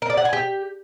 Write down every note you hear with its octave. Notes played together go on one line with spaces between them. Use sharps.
A#4
D5
F#5
G#5
G4